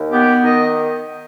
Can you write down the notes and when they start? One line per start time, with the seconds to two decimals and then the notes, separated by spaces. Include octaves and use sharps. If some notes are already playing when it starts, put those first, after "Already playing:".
Already playing: D#2
0.11 B3 G4
0.44 D#3 D#5